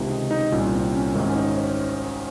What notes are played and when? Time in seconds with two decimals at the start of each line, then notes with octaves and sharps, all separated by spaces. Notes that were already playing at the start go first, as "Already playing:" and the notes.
Already playing: C#2 C3 D#3
0.09 D#4
0.31 D#4
0.52 C2 A#2 C#4
0.74 C4
0.94 C#4
1.15 G#1 G#2 D#3 D#4
1.27 C#4
1.36 D#4
1.47 C#5
1.57 C5